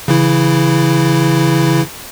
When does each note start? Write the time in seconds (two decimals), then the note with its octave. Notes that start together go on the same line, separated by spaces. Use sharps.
0.08 C#3 E3 E4